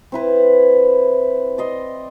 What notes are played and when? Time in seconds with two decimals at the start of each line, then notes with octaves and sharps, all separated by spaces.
0.12 C4 E4 B4
1.58 D5 D#5 C6